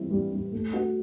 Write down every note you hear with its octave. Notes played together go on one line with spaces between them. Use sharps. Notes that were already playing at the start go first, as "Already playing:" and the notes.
Already playing: E3 G3 C4 E4
G3
G3
A3
F#4